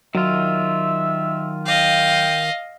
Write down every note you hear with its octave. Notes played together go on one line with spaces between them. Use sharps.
D#3 F#3 F4 E5
D#5 F5 G5